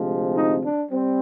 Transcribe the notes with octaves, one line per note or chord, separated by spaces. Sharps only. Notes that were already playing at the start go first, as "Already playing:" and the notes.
Already playing: D2 C3 F3 G#3 C4
D#4
D4
G3 C4